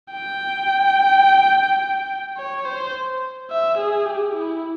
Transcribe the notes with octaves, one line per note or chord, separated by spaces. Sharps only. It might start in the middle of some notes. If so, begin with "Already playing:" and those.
G5
C#5
C5
E5
G#4
G4
E4